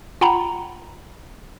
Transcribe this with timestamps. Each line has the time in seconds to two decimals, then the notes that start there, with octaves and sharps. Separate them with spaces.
0.21 F4 F#5 G5 A#5 B5